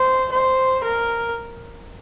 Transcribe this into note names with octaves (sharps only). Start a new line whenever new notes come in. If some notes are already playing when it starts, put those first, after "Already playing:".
Already playing: C5
C5
A#4